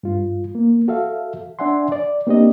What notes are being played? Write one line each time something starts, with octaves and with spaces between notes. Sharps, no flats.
G2 F4
A#3
F#4 A4 E5 F5
D4 D5 E5 F#5 G#5 C6
D5
A#3 C4 D4 G4 D5 D#5